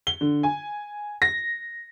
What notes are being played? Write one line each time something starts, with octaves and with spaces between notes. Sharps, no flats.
G7
D3
G#5
A#6